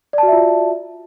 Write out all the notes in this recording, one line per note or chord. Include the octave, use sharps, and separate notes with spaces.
F4 F#4 D5 E5 A5